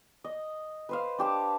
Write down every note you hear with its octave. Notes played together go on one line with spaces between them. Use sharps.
D#5
B4 C5 F5
D4 G4 A5